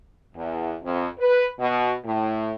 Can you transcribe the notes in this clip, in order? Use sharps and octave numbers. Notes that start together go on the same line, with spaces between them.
E2
F2
B4
B2
A2